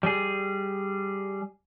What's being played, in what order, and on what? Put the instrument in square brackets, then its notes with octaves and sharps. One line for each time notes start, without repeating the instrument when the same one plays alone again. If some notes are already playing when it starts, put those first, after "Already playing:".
[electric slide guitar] G3 G#4